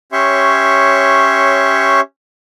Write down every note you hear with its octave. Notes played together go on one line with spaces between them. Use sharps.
C#4 G4 C#5 E5 C6 C#6